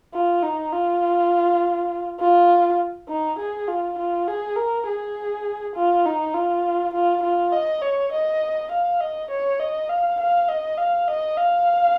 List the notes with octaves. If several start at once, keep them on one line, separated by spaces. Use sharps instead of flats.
F4
D#4
F4
F4
D#4
G#4
F4
F4
G#4
A#4
G#4
F4
D#4
F4
F4
F4
D#5
C#5
D#5
F5
D#5
C#5
D#5
F5
F5
D#5
F5
D#5
F5